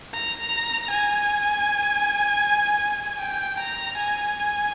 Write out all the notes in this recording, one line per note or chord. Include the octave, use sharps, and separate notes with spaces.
A#5
G#5
G5
A#5
G#5